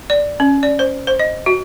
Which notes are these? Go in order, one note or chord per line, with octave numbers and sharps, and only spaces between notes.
D5
C#4
D5
C5
C5
D#5
F#4